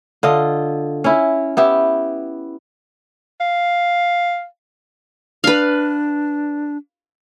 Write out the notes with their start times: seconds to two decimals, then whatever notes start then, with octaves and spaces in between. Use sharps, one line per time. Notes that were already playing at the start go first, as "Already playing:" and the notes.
0.23 D3 F4 D#5
1.04 C#4 E4
1.57 B3 E4 G4
3.40 F5
5.44 D4 B4 F5